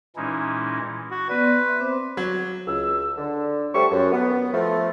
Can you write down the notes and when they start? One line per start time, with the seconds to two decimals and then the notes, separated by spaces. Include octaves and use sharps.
0.16 A#2 E3 G#3 C#4 D#4 E4
1.11 F#4
1.29 B3 B4 D5
1.44 C6
1.69 E5 C6
1.80 C4 C5 D6
2.17 F#3
2.67 C#2 E6
3.18 D3
3.74 D3 G3 A3 G4 C5 C#6
3.92 F#2
4.13 B3
4.54 F3 A3